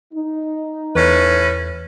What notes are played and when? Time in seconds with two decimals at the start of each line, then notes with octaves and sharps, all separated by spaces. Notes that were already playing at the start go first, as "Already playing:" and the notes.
0.14 D#4
0.95 E2 A2 C#4 B4